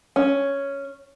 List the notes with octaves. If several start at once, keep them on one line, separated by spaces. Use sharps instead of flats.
C#4